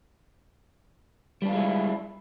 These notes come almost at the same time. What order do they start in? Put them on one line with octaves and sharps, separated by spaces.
G3 D4 F4 G#3 E4